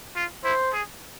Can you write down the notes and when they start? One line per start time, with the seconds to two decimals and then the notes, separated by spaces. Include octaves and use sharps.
0.16 F4
0.44 E4 C5
0.73 G#4